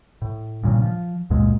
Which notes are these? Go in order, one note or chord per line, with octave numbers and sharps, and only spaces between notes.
A2
G2 A#2 C#3
F3
C#2 F#2 A#2 G#3